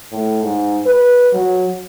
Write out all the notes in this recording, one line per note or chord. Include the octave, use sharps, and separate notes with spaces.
A2
G#2
B4
F#3